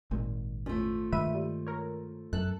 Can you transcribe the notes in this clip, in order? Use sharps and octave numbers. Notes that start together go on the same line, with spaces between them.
G#1 A#2 G#3
E2 F3 A3 C#4
G2 D#3 G#3 B4 E5 D#7
G3
A#4 C#5
F#2 A4 F#6